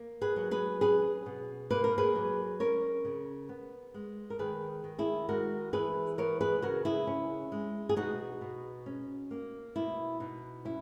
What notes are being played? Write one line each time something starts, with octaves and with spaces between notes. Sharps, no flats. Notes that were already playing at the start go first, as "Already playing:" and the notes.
Already playing: A#3
G#4 B4
F#3
G#4 B4
C#4 G#4 B4
B2
A#3 B4
A#4
G#4 B4
F#3
C#4 A#4 C#5
C#3
B3
G#3
A#4
D#3 G#4 B4
D#3
E4 G#4
G#3 F#4 A#4
E3 G#4 B4
B3 A#4 C#5
G#4 B4
C#3 F#4 A#4
E4 G#4
C#4
G#3
G#4
B2 D#4 F#4
B2
C#4
A#3
B2 E4
B2 D#4
C#4 E4